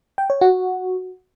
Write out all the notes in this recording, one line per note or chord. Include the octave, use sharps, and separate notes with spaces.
G5
C#5
F#4